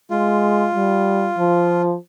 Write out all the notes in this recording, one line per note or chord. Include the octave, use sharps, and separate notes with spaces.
G#3 F4
G3
F3